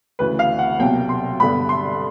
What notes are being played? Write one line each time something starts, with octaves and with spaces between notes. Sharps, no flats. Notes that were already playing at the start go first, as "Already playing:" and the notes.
D2 C#3 E3 B4
F5
F#5
C2 B2 F#3 A#3 G5
C6
G2 D3 G3 B3 B5
C6